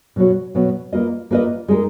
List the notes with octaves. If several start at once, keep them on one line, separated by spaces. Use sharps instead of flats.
B2 F#3 B3 F#4 C#5
B2 F#3 B3 F#4 C#5
A#3 F4 B4 D#5
A#3 F4 B4 D#5
G#3 D#4 A#4